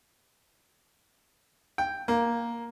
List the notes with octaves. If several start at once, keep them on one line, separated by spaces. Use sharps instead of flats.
G5
A#3